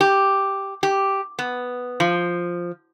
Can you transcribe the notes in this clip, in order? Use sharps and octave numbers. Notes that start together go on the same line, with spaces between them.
G4
G4
B3
F3